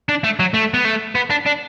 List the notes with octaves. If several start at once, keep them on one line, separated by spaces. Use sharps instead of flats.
D4
A3
F#3
A3
B3
A3
B3
D4
D4